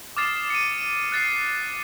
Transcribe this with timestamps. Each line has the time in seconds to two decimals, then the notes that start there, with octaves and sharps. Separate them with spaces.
0.17 D6 D#6 F6 A6 C7 E7
0.50 C#7 D#7
1.12 F#6 A6 C7